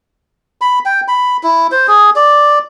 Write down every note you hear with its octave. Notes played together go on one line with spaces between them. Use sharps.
B5
G5
B5
E4
C5
G#4
D5